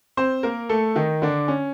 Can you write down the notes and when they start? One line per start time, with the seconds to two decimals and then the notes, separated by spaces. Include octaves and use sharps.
0.17 C4 C5
0.43 A#3 A#4
0.69 A3 A4
0.96 D#3 D#4
1.22 D3 D4
1.48 C#4